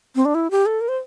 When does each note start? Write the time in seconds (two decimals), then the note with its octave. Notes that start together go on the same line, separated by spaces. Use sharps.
0.16 C4
0.25 D4
0.35 E4
0.51 G4
0.66 A4
0.81 A#4
0.88 C5